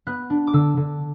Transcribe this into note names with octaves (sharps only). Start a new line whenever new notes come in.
B3 F#6
D4
D6
D3 E6
D3